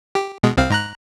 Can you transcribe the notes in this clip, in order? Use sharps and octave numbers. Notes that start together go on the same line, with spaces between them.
G4
B2 G#3
C2 C4 F5
G#2 A#5 F#6